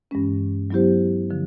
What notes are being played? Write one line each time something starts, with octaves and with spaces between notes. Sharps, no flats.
G2 E3 G#3 C#4
F#3 B3 E4 G4 C5
D3 F3